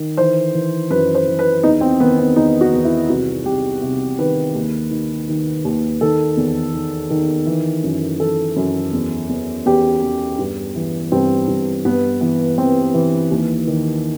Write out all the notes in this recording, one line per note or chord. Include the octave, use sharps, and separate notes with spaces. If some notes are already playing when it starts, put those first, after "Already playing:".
Already playing: D#3
E3 C5
E3
F#2 B4
C5
E3
B4
E2 D#4
C4
D#3 B3
C4
E2 D#4
F#4
E2
E4
C2 F#4
C2 G4
C3
D#3 B4
D#2
D#3
D#3
D#2
D#3 A4
E2
D#3
D#3
E3
F#2
E3 A4
F#2
E2
E2
E2 G4
E2
G2
E3
G2 C4
G2
G2 B3
E3 B3
E3 C4
E3
D#2
D#3